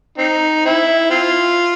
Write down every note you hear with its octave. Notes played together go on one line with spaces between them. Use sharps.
C4 D#4
C4 E4
C4 F4